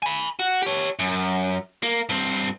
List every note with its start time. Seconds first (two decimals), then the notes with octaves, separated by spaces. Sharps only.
0.02 G#5 B5
0.39 F#4
0.63 G4 C#5
0.99 F#2
1.83 A#3
2.09 G2 C4